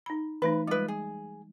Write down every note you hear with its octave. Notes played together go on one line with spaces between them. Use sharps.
D#4 B5
E3 A3 D#4 B4
G3 G#3 F4 B4
G#4